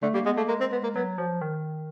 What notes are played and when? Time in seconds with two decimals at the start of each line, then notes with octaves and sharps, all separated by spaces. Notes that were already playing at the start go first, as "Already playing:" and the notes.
0.02 D3 A3
0.14 G3 A#3
0.26 G#3 B3
0.37 A3 A#3
0.48 G#3 A#3
0.60 C4
0.72 B3
0.83 A#3
0.95 F#3 B3
1.18 F3 F#3
1.41 D#3